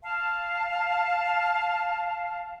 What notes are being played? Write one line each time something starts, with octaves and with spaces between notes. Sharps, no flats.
F5 A5